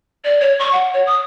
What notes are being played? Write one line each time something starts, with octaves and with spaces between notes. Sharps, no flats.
D5
C#5
C#6
F#5
C#5
D#6